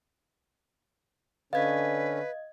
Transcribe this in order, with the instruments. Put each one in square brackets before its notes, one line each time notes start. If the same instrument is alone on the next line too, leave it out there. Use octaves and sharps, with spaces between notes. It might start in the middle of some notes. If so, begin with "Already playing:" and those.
[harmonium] D3 C#4 [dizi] B4 [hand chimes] D#5 G#6 [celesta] F5